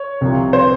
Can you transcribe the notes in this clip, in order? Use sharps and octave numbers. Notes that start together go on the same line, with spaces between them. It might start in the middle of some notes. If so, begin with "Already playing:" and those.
Already playing: C#5
C2 C3 F3
C5